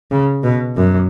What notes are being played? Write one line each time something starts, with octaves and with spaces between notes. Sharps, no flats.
C#3
B2
F#2